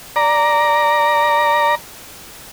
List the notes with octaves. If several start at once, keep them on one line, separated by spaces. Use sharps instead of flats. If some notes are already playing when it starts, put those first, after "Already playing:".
D5 A#5